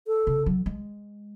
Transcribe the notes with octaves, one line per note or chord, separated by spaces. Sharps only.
A4
C#3
F#3
G#3